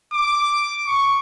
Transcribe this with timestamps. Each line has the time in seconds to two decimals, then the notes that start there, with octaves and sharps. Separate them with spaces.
0.13 D6
0.86 C#6